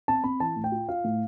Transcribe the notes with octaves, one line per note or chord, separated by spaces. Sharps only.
C4 A5
C4 B5
E3 A5
A2
G5
F4
F4 F5
A2